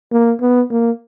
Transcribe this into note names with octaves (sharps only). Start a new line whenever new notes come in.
A#3
B3
A#3